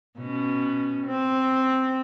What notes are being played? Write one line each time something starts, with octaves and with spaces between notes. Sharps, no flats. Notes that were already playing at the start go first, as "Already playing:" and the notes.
B2 C#4
C4